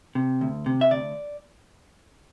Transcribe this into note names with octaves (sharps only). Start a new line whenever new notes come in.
C3
D2
C3
E5
D2 D5